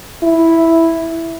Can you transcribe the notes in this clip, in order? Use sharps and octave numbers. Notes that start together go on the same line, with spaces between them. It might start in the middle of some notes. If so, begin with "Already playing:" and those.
E4